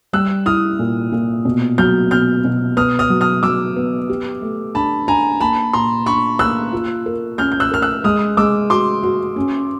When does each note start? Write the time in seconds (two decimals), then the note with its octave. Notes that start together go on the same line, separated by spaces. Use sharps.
0.13 G3 E6 F#6
0.46 E4 D#6 F6
0.79 A#2
1.12 A#2
1.45 B2
1.78 F#3 F6 G6
2.11 B2 F6 G6
2.44 B2
2.77 B3 D#6 F6
2.99 D#6 F6
3.10 F#3
3.21 D#6 F6
3.43 F#3 D6 E6
3.76 B3
4.09 G4
4.42 A3
4.75 D4 A5 B5
5.08 D4 G#5 A#5
5.41 A#3 A5 B5
5.73 A#2 A#5 C6
6.06 D4 B5 C#6
6.39 A#3 E6 F#6
6.73 F4
7.06 A#4
7.38 C#4 F6 G6
7.52 G6
7.60 E6 F#6
7.71 A#4 F6
7.82 E6 F#6
8.04 G#3 D#6 F6
8.37 G#3 D6 E6
8.70 F#4 C6 D6
9.03 F#4
9.36 C#4